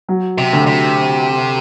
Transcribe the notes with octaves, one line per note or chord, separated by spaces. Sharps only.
F#3
C3
D2
C3